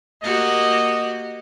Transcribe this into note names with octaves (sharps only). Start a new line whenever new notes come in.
A#3 F#4 G4 D#5